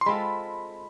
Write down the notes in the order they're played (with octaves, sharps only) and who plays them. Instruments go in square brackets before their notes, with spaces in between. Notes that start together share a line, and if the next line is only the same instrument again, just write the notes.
[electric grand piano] C6
[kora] G#3 C4 F4 A4 [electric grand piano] B5